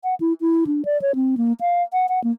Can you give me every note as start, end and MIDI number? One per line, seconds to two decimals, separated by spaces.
0.04 0.15 78
0.20 0.33 64
0.41 0.64 64
0.67 0.84 62
0.85 1.00 74
1.02 1.15 73
1.15 1.35 60
1.37 1.53 58
1.61 1.83 77
1.93 2.07 78
2.09 2.22 78
2.24 2.31 58